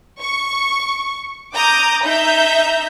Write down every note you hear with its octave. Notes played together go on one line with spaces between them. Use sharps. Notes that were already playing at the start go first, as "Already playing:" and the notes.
C#6
A#5 D6 D#6 G6
D#4 E5 A#5 G6